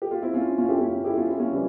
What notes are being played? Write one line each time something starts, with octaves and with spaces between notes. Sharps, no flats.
G4
F4
C4 E4
C#4 F4
C#4 F4
E4 G4
C#4 F4
E4 G4
C#4 F4
E4 G4
C#4 F4
E3 G3